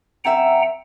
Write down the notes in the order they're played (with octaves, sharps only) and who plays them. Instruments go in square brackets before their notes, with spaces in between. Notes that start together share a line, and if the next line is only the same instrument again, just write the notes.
[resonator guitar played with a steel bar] F#2 C4 E5 [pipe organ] F#5 G5 A#5